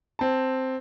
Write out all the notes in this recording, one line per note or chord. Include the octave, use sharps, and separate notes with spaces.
C4 A5